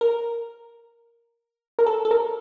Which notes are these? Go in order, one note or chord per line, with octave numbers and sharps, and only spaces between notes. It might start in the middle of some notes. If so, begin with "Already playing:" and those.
A#4
A#4
A4
A4
A#4